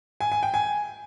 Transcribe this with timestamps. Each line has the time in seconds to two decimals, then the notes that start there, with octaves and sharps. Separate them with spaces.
0.21 G#5
0.32 G#5
0.43 G5
0.54 G#5